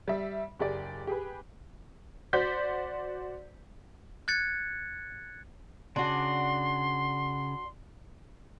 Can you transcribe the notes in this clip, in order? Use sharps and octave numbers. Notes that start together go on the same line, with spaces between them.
G3 E5
F#1 G4 G#4 D5
G4 G#4 B4
F#4 C5 D5 G6 B6
F#6 G#6 A6 C#7
C#3 D4 F#4 C6